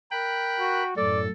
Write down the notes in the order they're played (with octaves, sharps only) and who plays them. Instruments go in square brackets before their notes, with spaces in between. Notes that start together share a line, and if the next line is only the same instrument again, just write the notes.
[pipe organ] A#4 B5 F#6 [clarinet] G5
[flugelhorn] F#4
[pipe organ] F#2 A2 [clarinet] A4 [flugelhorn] D5